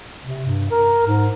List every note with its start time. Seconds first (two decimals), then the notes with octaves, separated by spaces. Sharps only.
0.25 C3
0.46 G2
0.71 A#4
1.07 G#2